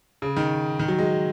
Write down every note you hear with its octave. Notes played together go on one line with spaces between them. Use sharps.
C#3
D#3
D#3
F#3
G#3